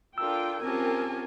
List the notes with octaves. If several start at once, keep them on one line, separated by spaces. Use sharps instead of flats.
D4 F4 A4 A#4 G5 E6
C4 C#4 F4 G4 G#4 A#4 G#5 A5